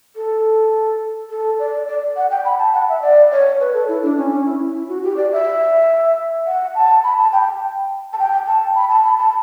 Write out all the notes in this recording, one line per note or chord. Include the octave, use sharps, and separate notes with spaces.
A4
A4
D5
D5
F#5
G5
B5
A5
F#5
E5
D5
C#5
B4
A4
E4
D4
C#4
C#4
E4
E4
F#4
G4
D5
E5
F#5
A5
B5
A5
G5
A5
G5
A5
B5
A5
B5
A5